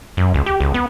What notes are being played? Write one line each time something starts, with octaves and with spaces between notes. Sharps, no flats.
F#2
C#2
G4
C#2
B3